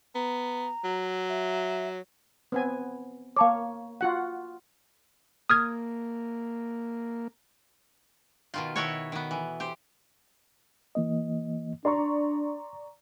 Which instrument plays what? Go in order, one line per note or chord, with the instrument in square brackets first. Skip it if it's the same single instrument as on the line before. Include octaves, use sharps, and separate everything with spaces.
[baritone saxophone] B3 [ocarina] A#5
[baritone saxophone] F#3
[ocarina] E5
[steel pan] B3 C4 G#5
[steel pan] A#3 C#5 [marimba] F5 A5 D6
[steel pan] F4 F#4 F#5
[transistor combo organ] A#3 [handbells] D#6 F6 G#6
[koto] B2 D#3 F4
B2 D#3 E4 F#4 A4 C#5
D#3 B3
E3
G4 C5
[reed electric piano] E3 A#3 D#5
[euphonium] D4 [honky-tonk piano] D5 A#5 C#6 [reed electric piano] C6